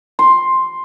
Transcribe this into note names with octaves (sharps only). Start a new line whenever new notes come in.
C6